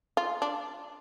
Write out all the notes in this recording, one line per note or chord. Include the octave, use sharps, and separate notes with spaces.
F4
D4